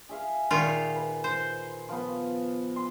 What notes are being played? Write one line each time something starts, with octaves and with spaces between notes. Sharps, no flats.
G#4 E5 F5
A#2 D#3 F4
B4
C5
F3 B3
C6